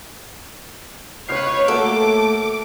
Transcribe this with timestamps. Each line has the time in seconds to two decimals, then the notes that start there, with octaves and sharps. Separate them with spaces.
1.28 C#2 B4 C#5 F6 C7
1.68 A3 A#3 F#4 A4 D6